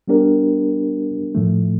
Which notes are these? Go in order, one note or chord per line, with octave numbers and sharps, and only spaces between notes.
G3 B3 D4 G4 A#4
A2 F3 A3